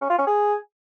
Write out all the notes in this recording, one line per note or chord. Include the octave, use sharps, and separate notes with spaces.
C#4
F4
C#4
G#4